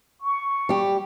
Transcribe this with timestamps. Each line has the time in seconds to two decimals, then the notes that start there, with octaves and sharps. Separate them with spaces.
0.21 C#6
0.69 G3 G4